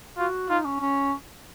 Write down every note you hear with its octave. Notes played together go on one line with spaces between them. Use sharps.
F4 F#4
D#4 F4
C#4
C#4